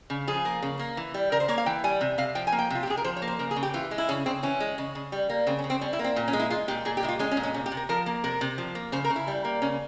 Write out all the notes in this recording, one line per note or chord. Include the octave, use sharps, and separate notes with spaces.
C#3
F3 G#4
A#3
C#3
A#3
E3
G3
C#3 A#4
C5
A#3 C#5
F5
E3 G5
G3 G#5
C3
C3 F5
F3 G5
G#5
A#3
G5
C3 F4
G4
C3 G#4
A#4
F3 C5
C#5
A#3
C5
C#3 A#4
G#4
C#3
G4
E3 F4
G#3
E4
C#3 C#4
C#3 C4
E3 C#4
G#3
C#3
C#3
G3
A#3
C#3 C4
C#4
C#3
C4
G3 C#4
E4
A#3
C4
A#2
C#4
G#3
E4
G#3 F4
A#2 G4
A#2 G#4
G4
G#3 E4
F4
G#3 C#4
C#4
A#2
C#4
C3 C#4
G4
C3
A#4
F3 A#4
A#3
C3 A#4
C3
F3
A#3
C#3 C5
A#4
C#3
E4
G3
A#3
C#3 C#4